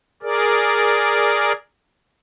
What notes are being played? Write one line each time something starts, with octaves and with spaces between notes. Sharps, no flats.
G#4 A#4 D5